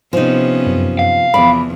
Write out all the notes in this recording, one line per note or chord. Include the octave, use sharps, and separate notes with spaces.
C3 F3 B3 C#4 D#4
F#2
F5
E2 F3 D5 B5